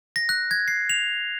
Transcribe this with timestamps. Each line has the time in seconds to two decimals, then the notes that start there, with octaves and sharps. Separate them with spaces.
0.16 A#6
0.29 F#6
0.51 G#6
0.68 C7
0.90 F7